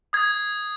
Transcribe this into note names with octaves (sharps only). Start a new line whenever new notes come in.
D#6 G#6